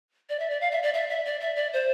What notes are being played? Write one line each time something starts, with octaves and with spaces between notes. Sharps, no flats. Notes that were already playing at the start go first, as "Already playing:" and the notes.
D5
E5
D5
F5
E5
D5
E5
E5
D5
E5
D5
C5